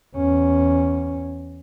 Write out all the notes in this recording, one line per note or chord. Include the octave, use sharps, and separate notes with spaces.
E2 C#4